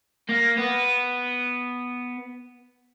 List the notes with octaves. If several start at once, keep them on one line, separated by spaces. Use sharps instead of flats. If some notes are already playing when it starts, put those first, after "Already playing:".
A#3
B3